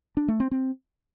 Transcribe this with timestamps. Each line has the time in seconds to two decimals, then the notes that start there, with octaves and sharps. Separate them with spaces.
0.17 D4
0.28 A3
0.40 C4
0.51 C4